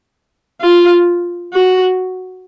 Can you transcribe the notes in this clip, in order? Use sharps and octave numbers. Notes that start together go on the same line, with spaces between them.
F4
F#4